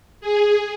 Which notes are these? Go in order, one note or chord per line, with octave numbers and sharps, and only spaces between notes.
G#4